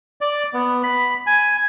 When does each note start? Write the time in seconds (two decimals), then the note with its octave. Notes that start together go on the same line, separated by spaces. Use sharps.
0.21 D5
0.54 B3
0.83 B5
1.27 G#5